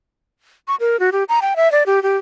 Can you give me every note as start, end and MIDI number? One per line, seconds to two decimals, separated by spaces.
0.68 0.75 85
0.80 0.99 70
1.00 1.10 66
1.12 1.24 67
1.29 1.39 82
1.42 1.54 79
1.56 1.71 76
1.72 1.83 74
1.86 2.02 67
2.03 2.17 67